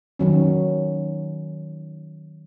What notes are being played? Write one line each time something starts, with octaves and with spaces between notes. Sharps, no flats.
D#3 F#3 C#4